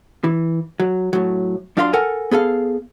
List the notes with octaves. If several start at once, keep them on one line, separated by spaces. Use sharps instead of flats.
E3
F#3
A2 F#3
F#2 D4 F4 F5 A#5 C6
A4 A#4 F#5 G#5
B3 G#4 A4 F5